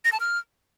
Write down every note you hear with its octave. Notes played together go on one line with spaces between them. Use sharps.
A#6
A5
F6